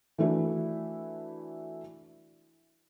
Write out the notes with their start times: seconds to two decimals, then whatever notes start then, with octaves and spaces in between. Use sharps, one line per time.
0.18 E3 A3 D4 E4 F#4